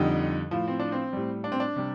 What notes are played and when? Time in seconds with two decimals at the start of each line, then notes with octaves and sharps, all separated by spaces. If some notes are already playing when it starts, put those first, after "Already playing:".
Already playing: F2 D3 G3 D#4
0.51 A2 F3
0.68 C4
0.79 D4
0.92 C4
1.13 A2 G3
1.44 D4
1.52 C4
1.60 D4
1.76 C3 G3